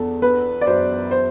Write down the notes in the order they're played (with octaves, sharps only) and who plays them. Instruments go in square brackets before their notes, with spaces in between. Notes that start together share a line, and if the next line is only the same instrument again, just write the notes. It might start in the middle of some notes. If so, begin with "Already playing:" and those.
Already playing: [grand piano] E2 [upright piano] A4
[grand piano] B3 [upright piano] B4
[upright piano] D5
[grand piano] F#2 [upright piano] C5
[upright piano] C5